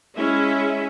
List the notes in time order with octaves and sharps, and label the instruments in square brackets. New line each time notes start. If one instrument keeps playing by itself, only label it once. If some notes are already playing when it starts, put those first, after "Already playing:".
[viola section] G#3 C#4 E4 E5